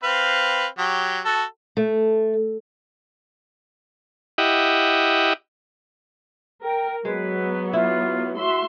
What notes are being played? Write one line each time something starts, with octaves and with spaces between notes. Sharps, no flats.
C4 B4 F5
F#3 G4
F#4 A4
A3
E4 G4 D#5 F#5
A#4 G5
F#3 G#3 B3 B4
E4 F4
F#4 E5 C6